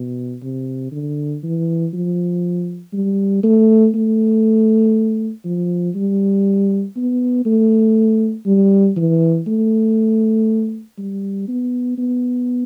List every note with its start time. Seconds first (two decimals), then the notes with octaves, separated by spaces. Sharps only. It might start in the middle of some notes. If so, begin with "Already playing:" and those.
Already playing: B2
0.43 C3
0.92 D3
1.43 E3
1.93 F3
2.93 G3
3.43 A3
3.94 A3
5.45 F3
5.95 G3
6.96 B3
7.45 A3
8.46 G3
8.96 E3
9.47 A3
10.98 G3
11.48 B3
11.98 B3